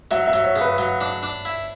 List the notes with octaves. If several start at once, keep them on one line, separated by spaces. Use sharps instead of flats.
F#3 E5
E5
F#3
C#5
C#3
B4
F#3
D4
D4
E4